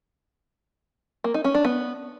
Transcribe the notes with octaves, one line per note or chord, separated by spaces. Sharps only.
A#3
D#4
C#4
D4
B3